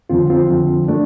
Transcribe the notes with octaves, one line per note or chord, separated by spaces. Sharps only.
F2 D3 F3 C4 F4
C4 F4
F2 D3 F3
A3 D4